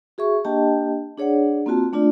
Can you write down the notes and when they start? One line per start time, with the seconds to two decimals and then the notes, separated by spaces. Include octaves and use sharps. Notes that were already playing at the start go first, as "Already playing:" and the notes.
0.18 F#4 G#4 E5 C#6
0.45 A#3 D4 G4 D#5 G5 A5
1.18 D4 G#4 C#5 D5 F#5
1.66 A#3 C4 F4 F#4 A5
1.93 A3 D4 F4 D5